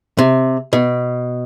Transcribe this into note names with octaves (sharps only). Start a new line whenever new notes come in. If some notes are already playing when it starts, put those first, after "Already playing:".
C3
B2